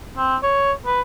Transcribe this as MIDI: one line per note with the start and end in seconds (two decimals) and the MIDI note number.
0.17 0.37 60
0.43 0.73 73
0.86 1.01 71